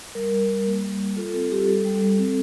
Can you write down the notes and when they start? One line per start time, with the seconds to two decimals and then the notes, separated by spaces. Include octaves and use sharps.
0.15 G3 A#4
0.32 G3
0.49 G3
0.67 A#3
0.83 G3
1.00 A#3
1.17 F4 A4
1.34 C4 A4
1.51 G3 G4
1.67 G3 A4
1.85 G3
2.02 G3
2.19 C4